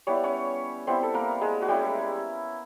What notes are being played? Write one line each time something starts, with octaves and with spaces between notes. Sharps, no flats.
G3 B3 E4 C#5
D5
C#4 C#5
G3 B3 C4 E4 C5
A4
A#3 A#4
G#3 G#4
F#4
G3 G#3 C#4 E4 G4